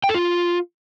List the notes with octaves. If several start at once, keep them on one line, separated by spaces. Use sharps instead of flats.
G5
A4
F4